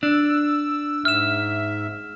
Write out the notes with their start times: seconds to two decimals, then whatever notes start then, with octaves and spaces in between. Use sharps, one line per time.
0.03 D4 E6
1.05 G#2 E5 F6 E7